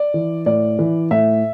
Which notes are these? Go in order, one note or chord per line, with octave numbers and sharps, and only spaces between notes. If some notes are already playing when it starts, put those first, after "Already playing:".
Already playing: D5
E3
A2 D5
E3
A2 E5